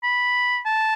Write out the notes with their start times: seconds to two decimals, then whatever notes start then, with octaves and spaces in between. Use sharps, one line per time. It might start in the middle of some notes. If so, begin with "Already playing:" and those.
0.03 B5
0.65 A5